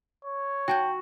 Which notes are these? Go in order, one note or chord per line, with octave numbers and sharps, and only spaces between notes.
C#5
F#4 G5 A5 G6